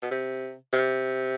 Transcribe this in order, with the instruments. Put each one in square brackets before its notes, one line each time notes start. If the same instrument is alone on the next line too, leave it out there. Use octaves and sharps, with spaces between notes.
[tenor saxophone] B2
C3
C3